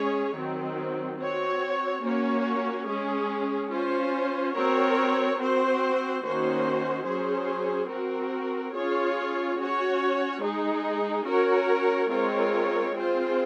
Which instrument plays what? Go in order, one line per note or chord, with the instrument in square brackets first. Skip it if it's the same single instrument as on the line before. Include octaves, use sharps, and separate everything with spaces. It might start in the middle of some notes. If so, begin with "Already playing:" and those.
Already playing: [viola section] G#3 C#4 G#4 C#5
D#3 F#3 C4
C4 F#4 C#5
A#3 C#4 F#4 C#5
G#3 C#4 G#4
C#4 F4 C5
C4 F#4 A#4 C#5
C4 F#4 C5
D#3 A#3 C#4 F#4 C5
F#3 C#4 G#4 C5
C4 F#4 A#4
C#4 F4 G#4 C#5
C#4 F#4 C#5
G#3 D#4 G#4
C#4 F#4 A#4 C#5
G#3 C4 F4 A#4 C#5
C4 F4 G#4 C5